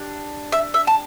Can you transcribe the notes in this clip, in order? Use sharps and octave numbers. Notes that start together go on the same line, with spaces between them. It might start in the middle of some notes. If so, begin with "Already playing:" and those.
Already playing: D4 G4
E5
E5
A5